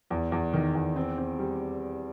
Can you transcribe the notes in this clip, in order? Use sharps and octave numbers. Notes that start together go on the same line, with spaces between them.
E2
E2
D#3
E2
C4
C4
G3